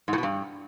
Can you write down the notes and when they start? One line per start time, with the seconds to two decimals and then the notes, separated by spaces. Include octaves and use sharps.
0.08 G#2
0.13 A2
0.18 B2
0.23 G2